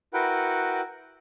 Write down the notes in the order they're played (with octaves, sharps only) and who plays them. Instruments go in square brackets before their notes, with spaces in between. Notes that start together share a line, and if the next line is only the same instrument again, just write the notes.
[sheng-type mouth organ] E4 F#4 A#4 B4 F#5 G5